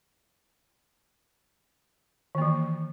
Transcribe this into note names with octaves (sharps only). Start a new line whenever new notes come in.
D#3 E3 A#3